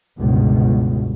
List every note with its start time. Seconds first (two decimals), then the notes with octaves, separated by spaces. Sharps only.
0.20 G1 C#2 B2